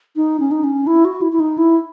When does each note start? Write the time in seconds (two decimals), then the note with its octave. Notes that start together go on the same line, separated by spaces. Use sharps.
0.16 D#4
0.40 C#4
0.51 D#4
0.64 C#4
0.87 E4
1.05 F#4
1.21 E4
1.32 E4
1.40 D#4
1.58 E4